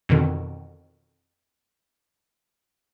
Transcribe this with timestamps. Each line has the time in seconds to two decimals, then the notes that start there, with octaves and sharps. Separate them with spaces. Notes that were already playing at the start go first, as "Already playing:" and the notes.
0.09 F2 B2 D3 D#3